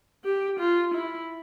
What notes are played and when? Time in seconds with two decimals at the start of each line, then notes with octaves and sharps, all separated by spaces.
0.24 G4
0.59 F4
0.94 E4